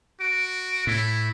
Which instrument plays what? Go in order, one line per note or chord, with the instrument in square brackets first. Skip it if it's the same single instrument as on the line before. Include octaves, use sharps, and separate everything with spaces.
[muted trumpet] F#4 [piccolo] D7
[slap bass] A2 [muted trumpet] E4